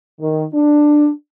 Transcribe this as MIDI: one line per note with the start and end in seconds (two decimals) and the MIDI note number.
0.20 0.43 51
0.53 1.10 62